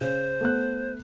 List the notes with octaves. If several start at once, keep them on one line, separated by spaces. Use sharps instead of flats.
C#3 C5
A3 B3 F#6